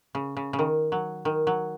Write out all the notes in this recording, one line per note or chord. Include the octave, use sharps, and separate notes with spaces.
C#3
C#3
C#3
D#3
F#3
D#3
F#3